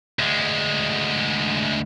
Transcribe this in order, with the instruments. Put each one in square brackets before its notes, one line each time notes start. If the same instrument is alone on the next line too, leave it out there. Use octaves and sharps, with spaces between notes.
[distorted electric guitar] D2 G#3